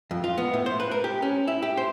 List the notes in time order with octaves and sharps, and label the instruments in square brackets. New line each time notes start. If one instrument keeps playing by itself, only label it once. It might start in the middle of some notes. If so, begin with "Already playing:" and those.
[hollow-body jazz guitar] F2
F4
B3
A2
C5
B4
A#4
G4
C#4
E4
G4
C5